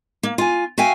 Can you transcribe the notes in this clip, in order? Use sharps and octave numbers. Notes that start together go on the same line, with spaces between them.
A#3
F4 G#5
F#4 E5 F5 G5 G#5